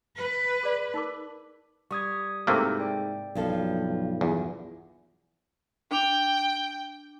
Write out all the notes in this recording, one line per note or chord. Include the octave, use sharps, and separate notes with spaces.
B4
G#4 D5
D#4 A#4 D6
G3 C#6 D#6 G#6
G#2 C3 A3 A#3 E4 A4
D5 G5
B1 G2 F3 A4
E2
D4 G5 D6 F7